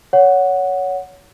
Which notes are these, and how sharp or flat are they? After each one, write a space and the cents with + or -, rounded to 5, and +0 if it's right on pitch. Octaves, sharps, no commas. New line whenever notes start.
C#5 +15 F#5 -5